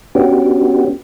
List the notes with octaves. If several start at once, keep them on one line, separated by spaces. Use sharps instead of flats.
B3 C#4 D4 F#4 G4